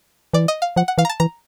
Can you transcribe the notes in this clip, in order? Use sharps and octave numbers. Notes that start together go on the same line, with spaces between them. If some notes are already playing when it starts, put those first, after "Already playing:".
E3 D5
D#5
F5
F3 F#5
F#5
E3 F5
A#5
A5
E3 A#5